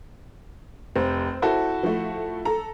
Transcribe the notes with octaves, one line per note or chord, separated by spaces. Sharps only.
F1 C4
E4 F#4 A4
F3 A3
A4 A#5